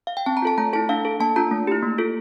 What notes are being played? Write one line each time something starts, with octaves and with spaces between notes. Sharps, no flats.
F5
G5
C4 A5
A#5
F4 A4 A5
A3 A#5
E4 A4 A5
D4 F5
A4
A#3 A5
D4 F4 A#5
A3
E4 G4
A#3
F4 A4